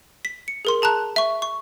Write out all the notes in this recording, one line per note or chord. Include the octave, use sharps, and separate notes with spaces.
B6
C#7
G#4 A#4 C6
G#4 A5 A#5 F#6
E5 C#6
C#6